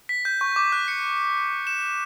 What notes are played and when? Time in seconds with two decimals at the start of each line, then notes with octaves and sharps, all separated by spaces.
0.09 B6
0.25 G6
0.41 C#6
0.56 D6
0.72 F#6
0.88 C#7
1.67 E7
1.82 E7